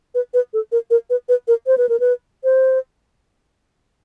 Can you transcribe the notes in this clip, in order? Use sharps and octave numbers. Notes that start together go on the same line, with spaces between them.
B4
B4
A4
A#4
A#4
B4
B4
A#4
C5
B4
A#4
B4
C5